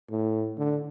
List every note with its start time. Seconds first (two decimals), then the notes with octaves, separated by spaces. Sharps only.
0.10 A2
0.58 D3